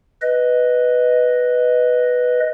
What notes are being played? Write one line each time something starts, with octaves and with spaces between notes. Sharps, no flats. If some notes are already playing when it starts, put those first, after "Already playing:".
B4 D#5